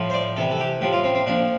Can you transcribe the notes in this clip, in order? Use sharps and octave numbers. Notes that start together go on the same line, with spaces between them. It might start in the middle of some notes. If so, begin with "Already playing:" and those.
Already playing: A2 F3
C5
D5
C3 E3 A4
A4
G4
A2 F3 G4
F4
C4
C4
A#2 F3 D4